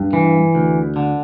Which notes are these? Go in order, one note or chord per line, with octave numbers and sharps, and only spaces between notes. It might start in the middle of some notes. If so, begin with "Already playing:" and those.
Already playing: G2
E3
D2
D3